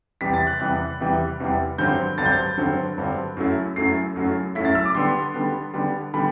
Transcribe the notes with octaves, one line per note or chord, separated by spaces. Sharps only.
E2 C3 E3 G3 B6
A6
F#6
E2 C3 E3 G3 F#6
E2 C3 E3 G3
E2 C3 E3 G3
G2 D3 F#3 C4 G6
G2 D3 F#3 C4 A6
G6
A6
G2 D3 F#3 C4
G2 D3 F#3 C4
F#2 F#3 A3 E4
F#2 F#3 A3 E4 C7
F#2 F#3 A3 E4
F#2 F#3 A3 E4 B6
A6
E6
D6
D3 G3 B3 C6
D3 G3 B3
D3 G3 B3
D3 G3 B3 B5